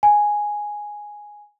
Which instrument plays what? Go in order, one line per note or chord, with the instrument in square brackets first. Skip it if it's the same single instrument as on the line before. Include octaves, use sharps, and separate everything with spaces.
[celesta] G#5